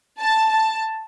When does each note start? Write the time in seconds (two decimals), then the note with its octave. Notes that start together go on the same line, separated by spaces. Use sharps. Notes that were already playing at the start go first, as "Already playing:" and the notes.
0.20 A5
0.50 A5